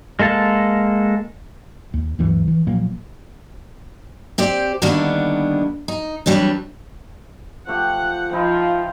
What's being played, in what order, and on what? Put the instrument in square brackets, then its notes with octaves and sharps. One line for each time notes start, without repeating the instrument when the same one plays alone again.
[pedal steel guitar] G#3 A#3 A4 A5
[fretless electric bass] D#2
D2 G2 E3 F#3
E3
A#2 F3 F#3 A#3
[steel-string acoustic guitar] C4 G4 C5 D5
D3 D#3 G3 A#3 B3 D4
D#4
E3 F#3 G3 C4 D4
[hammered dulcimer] F3 A3 G4 [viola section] F#5
[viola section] F3 [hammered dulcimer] D#4 E4 C6